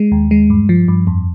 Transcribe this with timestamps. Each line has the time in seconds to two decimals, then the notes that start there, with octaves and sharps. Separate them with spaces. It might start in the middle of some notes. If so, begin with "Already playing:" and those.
Already playing: G#3
0.12 D#2
0.31 G#3
0.50 G2
0.69 F3
0.88 G2
1.07 F2